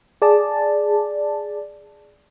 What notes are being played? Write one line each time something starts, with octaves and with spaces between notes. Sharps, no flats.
G#4 D5 A5